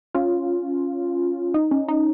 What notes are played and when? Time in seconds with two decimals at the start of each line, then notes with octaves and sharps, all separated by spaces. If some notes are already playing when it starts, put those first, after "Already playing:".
0.14 C#4 F4
1.54 D#4
1.71 C#4
1.88 D#4